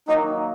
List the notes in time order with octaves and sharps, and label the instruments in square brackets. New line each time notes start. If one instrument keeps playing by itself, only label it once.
[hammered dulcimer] D#3 F#3 A#3 [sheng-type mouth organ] D#4